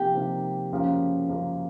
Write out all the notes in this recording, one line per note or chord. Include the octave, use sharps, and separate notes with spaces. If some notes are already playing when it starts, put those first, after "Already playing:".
Already playing: C3 F3 A#3 D#4 G4
C3 F3 A#3 D#4
F#2 C#3 F3 A#3
F#2 C#3 F3 A#3